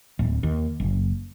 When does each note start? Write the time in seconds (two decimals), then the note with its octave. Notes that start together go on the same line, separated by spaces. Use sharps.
0.19 D1
0.43 D#2
0.80 F#1